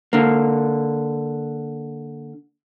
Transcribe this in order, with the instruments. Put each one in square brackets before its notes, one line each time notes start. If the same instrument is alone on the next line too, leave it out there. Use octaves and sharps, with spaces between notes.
[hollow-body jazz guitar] D3 A#3